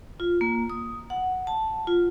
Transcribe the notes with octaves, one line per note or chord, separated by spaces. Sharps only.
F4
A#3
D#6
F#5
A5
F4